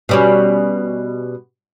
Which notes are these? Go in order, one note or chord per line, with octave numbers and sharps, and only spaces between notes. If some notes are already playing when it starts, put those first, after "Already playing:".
B2 G3 C#4